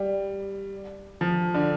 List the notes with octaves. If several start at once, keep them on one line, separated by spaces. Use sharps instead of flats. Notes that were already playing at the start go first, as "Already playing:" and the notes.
Already playing: G3
F3
D3